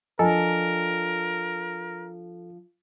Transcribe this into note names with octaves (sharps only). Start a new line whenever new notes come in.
F3 D4 A4 A#4 D#5 G#5 A#5